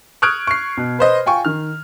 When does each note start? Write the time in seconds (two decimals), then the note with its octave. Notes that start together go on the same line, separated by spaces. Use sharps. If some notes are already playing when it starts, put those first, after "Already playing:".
0.22 C#6 D#6 F6 F#6 G#6 D7
0.47 C#6 C7
0.77 B2
0.99 B4 C5 D#5
1.26 F4 G5 G#5 C#6
1.44 D#3 F6